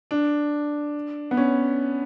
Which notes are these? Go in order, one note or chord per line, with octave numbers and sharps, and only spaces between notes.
D4
B3
C#4